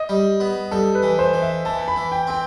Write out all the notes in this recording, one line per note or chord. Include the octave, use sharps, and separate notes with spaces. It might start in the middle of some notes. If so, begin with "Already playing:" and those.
Already playing: D#5
G3
B3
G3 A4
B4
E3
C5
E3
E5
E3 A5
B5
E3
G5
C4 G5